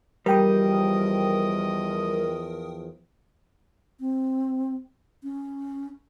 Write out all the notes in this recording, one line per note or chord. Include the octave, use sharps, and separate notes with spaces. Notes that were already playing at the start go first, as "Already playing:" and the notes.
E2 F3 G3 A#4 D#5 G5 D#6
C4
C#4